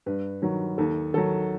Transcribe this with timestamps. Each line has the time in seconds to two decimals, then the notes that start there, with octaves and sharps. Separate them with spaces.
0.06 G2 B4
0.42 D#3 F#3
0.78 D#2 A4
1.14 D#3 F#3 A4